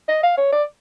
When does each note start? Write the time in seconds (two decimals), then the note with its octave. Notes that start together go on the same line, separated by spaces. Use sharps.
0.08 D#5
0.23 F5
0.37 C#5
0.52 D5